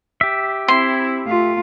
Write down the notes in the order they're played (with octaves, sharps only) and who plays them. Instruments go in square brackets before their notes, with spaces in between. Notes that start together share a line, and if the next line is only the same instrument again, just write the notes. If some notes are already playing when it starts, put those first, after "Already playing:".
[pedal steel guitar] G4 E5
[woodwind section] C4 E4 [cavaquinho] C6
[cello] A3 F4